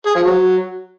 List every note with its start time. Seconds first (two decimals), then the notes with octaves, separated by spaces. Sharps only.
0.06 G#4
0.15 F3
0.24 F#3